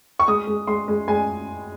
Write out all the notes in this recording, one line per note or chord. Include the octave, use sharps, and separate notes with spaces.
C#6
G#3 D#6
G#3
G#3 C6
G#3
G#3 G#5